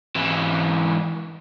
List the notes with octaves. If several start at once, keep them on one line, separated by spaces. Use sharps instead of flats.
G#2 E3